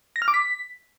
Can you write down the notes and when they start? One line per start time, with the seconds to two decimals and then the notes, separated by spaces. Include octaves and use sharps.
0.16 A#6
0.22 F6
0.28 D6
0.34 B6